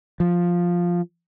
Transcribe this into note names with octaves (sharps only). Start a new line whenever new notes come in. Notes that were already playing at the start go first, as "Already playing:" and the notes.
F3